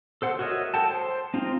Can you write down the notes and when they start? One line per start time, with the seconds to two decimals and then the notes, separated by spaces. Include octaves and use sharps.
0.22 A4 C5 F#5
0.39 F#4 A#4 C#5 D#5 E5
0.74 A4 F#5 G5 A5
0.91 C5
1.34 C4 D#4 F4